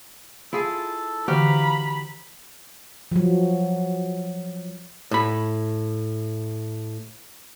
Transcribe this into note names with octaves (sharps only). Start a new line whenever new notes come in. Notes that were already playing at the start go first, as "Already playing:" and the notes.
E4 F4 G#4 A4
D3 E3 F#4 G4 C5 F5 A#5 B5
F3 F#3
A2 B5